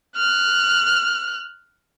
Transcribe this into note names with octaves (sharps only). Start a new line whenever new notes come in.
F6 F#6